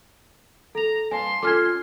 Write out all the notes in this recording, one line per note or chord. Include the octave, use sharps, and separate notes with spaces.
A4 A#5 F7
G2 F5 G#5 A5 C6
C#4 F4 A4 D6 F6 G#6